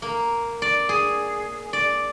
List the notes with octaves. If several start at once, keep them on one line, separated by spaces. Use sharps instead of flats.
A#3
D5
G#4
D5